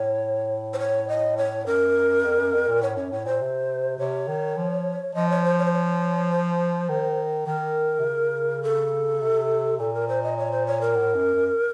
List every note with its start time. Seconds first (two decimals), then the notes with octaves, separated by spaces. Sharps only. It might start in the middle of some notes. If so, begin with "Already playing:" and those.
Already playing: A2 C#5
0.73 C5
0.79 C#5
1.09 D#5
1.37 C#5
1.66 F#2 A#4
2.24 F2
2.38 F#2
2.53 F2
2.68 A#2
2.82 A2 C#5
2.97 F#2 C#5
3.12 A2 C#5
3.26 A#2 C5
3.41 C3
3.98 C3 C#5
4.28 D#3
4.57 F3
5.14 F3 D#5
5.29 C#5
5.44 C5
5.58 C#5
5.65 C5
5.73 C#5
6.31 C5
6.89 D#3
7.47 D#3 A#4
8.00 C3
8.05 C#3
8.63 A4
9.21 C3
9.79 A#2 A4
9.94 A#4
10.08 C5
10.23 D#5
10.37 C#5
10.51 C5
10.66 C#5
10.81 A#4
10.96 A2
11.15 F#2
11.34 F#2